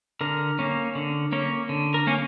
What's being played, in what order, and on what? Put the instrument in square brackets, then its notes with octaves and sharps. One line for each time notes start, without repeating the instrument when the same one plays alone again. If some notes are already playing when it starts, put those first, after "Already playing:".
[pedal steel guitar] D3 A#4
A#3 C#4
D3
A#3 C#4
D3
A#4
A#3 C#4